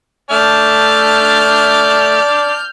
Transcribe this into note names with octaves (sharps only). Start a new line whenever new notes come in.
A3 D5 E5 A5 F6 G6